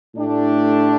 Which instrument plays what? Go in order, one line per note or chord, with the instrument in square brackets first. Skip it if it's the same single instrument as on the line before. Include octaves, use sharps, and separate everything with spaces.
[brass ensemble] A2 A3 D4 G4